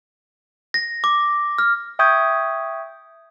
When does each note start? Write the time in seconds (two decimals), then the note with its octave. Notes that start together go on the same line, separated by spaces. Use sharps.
0.74 A#6
1.04 D6
1.58 F6
1.99 E5 G5 C#6 D#6 G6 G#6